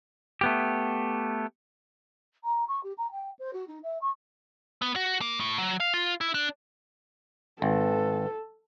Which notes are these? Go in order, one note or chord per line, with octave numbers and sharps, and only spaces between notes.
A3 B3 G4
A#5
C#6
G4
A#5
G5
C5
F#4
D#4
E5
C#6
B3
F#4
A#3
A2
F#3
F5
F4
E4
D4
G#1 A4 B4